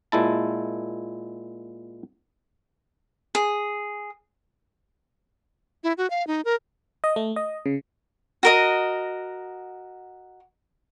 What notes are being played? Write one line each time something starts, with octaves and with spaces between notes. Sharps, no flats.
A#2 G#3 E4 A5
G#4
E4
F#4
F5
D#4
A#4
D#5
A3
D#5
C#3
F#4 A#4 D#5